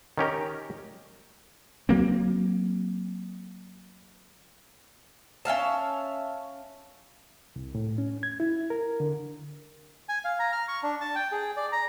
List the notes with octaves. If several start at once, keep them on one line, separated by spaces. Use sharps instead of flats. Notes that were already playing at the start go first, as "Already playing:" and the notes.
D#3 C#4 G4 A#4
F#3 A#3 C4
C#4 E5 F5 A5
C2
A2
C#4
G#6
E4
A#4
D3
G#5
F5
A#5
F6
C#6
D4
A5
G5
G#4
D5
A#5